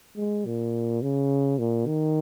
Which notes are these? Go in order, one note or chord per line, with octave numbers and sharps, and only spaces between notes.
G#3
A#2
C#3
A#2
D#3